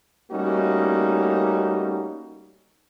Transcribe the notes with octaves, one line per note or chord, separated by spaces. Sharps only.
G3 A3 A#3 C#4 D#4 F#4